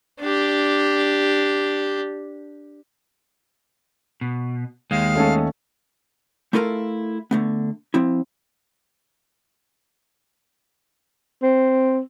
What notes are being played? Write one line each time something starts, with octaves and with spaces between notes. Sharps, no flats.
D4 G4
B2
D#2 G#3 F5
A3 C#4 A4
A3 E4 F4 A4 A#4 F5
D3 A3 B3
F3 C4 E4
C4